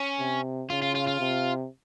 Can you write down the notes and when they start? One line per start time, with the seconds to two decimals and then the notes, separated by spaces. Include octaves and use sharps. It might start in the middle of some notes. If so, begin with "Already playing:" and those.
Already playing: C#4
0.19 C3
0.70 C#3 F4
0.82 F4
0.96 F4
1.08 F4
1.20 C3